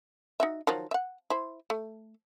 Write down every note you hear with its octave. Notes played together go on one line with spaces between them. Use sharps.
D#4 F#4 E5
D#3 F3 F#3
E5 F#5
E4 C5
A3